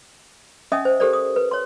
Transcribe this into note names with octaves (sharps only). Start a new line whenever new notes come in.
C#4 D#5 E5 G#5 D#6
C5
G4 A4 A#4 C5 D5
D#6
B4
C#5 C6